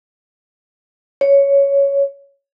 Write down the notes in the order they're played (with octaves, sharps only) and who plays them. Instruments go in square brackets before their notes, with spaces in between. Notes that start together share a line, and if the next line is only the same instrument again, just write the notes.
[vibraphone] C#5